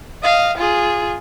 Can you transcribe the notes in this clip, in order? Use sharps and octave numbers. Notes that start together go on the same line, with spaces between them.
D#5 F5
F4 G#4